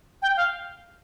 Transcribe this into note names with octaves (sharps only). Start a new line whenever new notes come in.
G5
F5